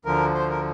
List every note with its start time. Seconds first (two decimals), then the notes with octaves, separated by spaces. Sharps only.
0.05 D2 D3 F3 A#4
0.34 C5
0.50 A#4